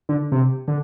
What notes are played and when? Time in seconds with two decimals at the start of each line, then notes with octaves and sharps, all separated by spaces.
0.09 D3
0.32 C3
0.68 D3